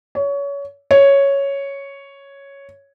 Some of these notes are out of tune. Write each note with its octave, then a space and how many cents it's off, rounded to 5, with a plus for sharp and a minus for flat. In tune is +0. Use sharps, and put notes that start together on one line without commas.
C#5 +25
C#5 +0